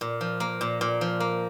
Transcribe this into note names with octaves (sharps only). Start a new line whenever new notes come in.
A#2
F3
A#3
A#2
A#2
F3
A#3